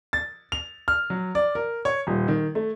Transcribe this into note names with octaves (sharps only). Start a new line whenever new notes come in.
A6
F7
F6
F#3
D5
A#4
C#5
D#1
D#3
A3